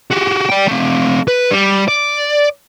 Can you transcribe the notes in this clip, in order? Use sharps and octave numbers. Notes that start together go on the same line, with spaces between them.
F#4 G4
D5 G5
A3 C4
B4
G3
D5